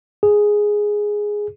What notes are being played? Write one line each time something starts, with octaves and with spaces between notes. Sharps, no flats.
G#4